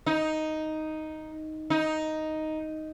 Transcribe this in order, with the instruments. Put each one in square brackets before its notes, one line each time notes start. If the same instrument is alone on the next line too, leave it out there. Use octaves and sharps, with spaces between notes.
[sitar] D#4
D#4